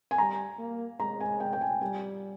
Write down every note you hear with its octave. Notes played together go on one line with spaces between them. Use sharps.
G#5
G3 A#5
A#3
G#3 A#5
G#5
G5
G5
G#5
G3 G#5